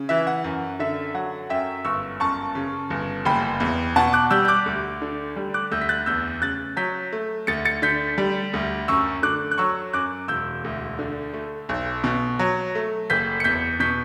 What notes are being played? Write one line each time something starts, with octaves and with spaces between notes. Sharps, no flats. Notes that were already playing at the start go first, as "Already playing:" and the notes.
Already playing: C#3
E3 E5
F#5
F#2
D3 E5
F#3 F#5
F#2 E5 G5
G1 C#6 E6
F#2 A5 C#6
C#3
G1
F#1 G5 B5
E2
B2 F#5 A5
D6 F#6
G3 E6 G6
G6
D6 F#6
D2
D3
G3
D6 F#6
D2 E6 G6
B6
F#6 A6
E2 E6 G6
C#3 F#6 A6
F#3 G6 B6
A3
D2 A6 C#7
A6 C#7
D3 G6 B6
G3
D2
F#2 C#6 E6
D3 D6 F#6
F#6
F#3 C#6 E6
F#2 D6 F#6
E1 E6 G6
D2
D3
A3
B1
B2
F#3
A3
F#1 G6 B6
C#7
E2 G6 B6
B2 G6 B6